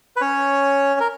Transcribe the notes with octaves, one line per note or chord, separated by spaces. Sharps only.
B4
C#4 C#5
A#4